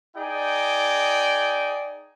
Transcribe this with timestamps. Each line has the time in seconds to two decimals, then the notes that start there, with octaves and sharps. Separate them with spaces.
0.16 D#4 G#4 D5 G5